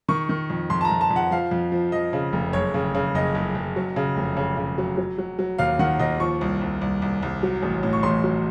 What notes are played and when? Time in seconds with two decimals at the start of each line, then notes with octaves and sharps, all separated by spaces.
0.08 D#3 C#6
0.29 D#3
0.50 F2
0.70 F2 C6
0.81 A5
0.85 A#5
0.91 F2
1.01 A5
1.11 F2
1.16 F#5
1.31 F3 F5
1.51 F2
1.72 F3
1.92 F3 D#5
2.13 C#3
2.33 F1
2.53 F#1 C#5
2.74 C#3
2.95 C#3
3.15 F#1 D#5
3.35 F#1
3.55 F#1
3.76 F#3
3.96 C#3
4.16 F1
4.37 C#3
4.57 C#3
4.78 F#3
4.97 F#3
5.18 F#3
5.39 F#3
5.58 D#2 F5
5.79 D#3 F#5
5.99 D#2 D#5
6.20 F3 C#6
6.41 C2
6.61 C2
6.81 C2
7.02 C2
7.23 C2
7.43 F#3
7.63 A1
7.83 A2
7.93 C#6
8.03 A1 C6
8.24 F#3